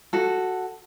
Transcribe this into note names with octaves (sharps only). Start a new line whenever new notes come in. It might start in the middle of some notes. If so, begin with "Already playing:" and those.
F#4 A4